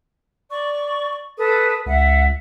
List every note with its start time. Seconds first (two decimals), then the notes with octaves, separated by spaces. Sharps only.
0.49 D5 C#6
1.38 A4 B4 D#6
1.86 C#2 E5 F#5